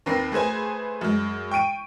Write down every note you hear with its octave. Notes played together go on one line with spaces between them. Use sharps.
D#2 C4 A#4 B4 A#6 C7
A3 G#4 B4 C5 G#5
F#2 G#3
G5 C#6 D7 D#7